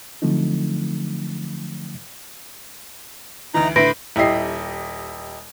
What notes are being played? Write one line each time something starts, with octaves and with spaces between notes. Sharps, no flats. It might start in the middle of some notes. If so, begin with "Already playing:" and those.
D3 F3 F#3 A3 C4 D#4
D2 E3 D#4 A#5
A2 D3 E4 B4 B5 C6 A#6 D7
D#1 E4 G4 D#5 C7